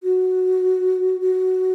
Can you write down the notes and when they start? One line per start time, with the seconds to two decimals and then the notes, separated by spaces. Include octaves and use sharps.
0.03 F#4
1.21 F#4